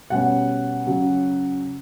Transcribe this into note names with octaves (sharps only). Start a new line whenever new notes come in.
B2 G3 C#4 F#5
C#3 F#3 C#4